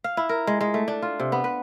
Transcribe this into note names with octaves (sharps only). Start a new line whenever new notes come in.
F5
E4
A#4
G#3
G#3
A3
D4
F4
C3
B3
B4